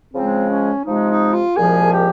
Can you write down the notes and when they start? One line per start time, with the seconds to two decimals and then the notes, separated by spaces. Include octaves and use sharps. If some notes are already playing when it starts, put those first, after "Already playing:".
0.14 C#3 F3 G#3 C4
0.50 C#4
0.85 C3 F3 G#3 D#4
1.09 D#4
1.33 F4
1.56 C2 A#2 F3 G#3 G#4
1.92 G4